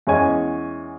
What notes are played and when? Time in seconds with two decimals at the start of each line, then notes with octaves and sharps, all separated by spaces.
0.07 E2 E3 G#3 C#4 C#5 G#5